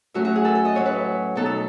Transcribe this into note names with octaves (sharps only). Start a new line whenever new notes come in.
A2 F#3 A3 C#4 F#4
F#4
G#4
A4
A4
D#5
A2 F#3 C#4 C#5
B4
B2 F#3 B3 D#4 A4
A4